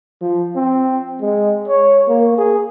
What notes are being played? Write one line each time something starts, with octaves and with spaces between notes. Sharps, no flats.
F3
C4
G#3
C#5
A#3
G#4